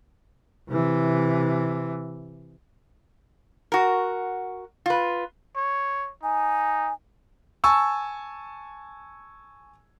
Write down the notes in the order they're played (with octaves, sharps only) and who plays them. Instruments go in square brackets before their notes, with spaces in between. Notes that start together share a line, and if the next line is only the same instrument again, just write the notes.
[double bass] C3 E3
[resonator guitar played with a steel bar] F#4 A#4
F4 B4
[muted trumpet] C#5
[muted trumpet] D#4 [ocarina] G#5
[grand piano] G#5 A5 C#6 E6